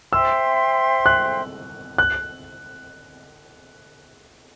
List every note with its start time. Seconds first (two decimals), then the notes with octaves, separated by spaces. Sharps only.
0.12 C5 E5 G5 C6 E6
1.06 F#6
1.98 F#6